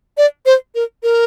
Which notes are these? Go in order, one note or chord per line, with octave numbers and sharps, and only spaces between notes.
D5
C5
A#4
A#4